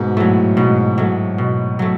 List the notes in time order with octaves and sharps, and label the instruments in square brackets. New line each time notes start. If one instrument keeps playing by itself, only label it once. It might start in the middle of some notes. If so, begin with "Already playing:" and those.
Already playing: [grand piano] G#2 B2
[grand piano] A2 [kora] F#3 A3
[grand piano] G#2 [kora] B2
[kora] F#3 A3
B2
F#3 A3